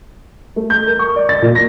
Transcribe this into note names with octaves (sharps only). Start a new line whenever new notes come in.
A3
G6
A#4
C#6
D5
A6
A#2
A#6